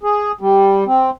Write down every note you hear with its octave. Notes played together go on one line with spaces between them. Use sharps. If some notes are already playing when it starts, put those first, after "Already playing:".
G#4
G3
C4